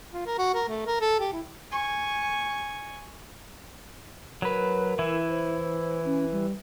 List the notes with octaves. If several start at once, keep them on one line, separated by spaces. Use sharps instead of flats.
F4
A#4
F#4
A#4
A3
A#4
A4
G4
E4
G#5 C#6
F#3 A#4 B4
E3 E4
C5
C#4
G3